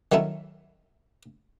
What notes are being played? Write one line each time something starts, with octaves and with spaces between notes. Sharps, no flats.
D#3 F#3 A3 C#4 E4